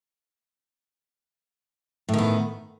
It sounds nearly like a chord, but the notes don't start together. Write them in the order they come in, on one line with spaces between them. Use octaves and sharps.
A2 D#3 B3